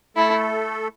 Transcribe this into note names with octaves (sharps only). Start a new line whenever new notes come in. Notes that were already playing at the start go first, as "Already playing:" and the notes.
A3 E4 A4